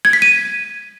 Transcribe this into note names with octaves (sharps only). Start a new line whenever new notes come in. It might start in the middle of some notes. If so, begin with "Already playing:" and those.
G#6
B6
D#7